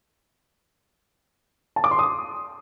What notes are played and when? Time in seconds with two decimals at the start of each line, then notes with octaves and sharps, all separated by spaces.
1.76 A5
1.84 D6
1.91 C6
1.99 D#6